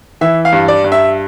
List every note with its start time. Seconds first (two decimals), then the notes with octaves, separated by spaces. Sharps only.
0.21 E3 E5
0.45 F5
0.53 G2
0.68 D5
0.84 G2
0.92 E5